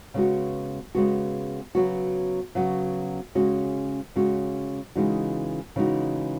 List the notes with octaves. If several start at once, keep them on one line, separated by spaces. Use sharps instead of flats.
C#3 G#3 B3 F#4
C#3 G#3 B3 F#4
C#3 F#3 B3 F#4
C#3 F#3 B3 F#4
C#3 G#3 C#4 F#4
C#3 G#3 C#4 F#4
C#3 E3 G#3 D#4 F#4
C#3 E3 G#3 D#4 F#4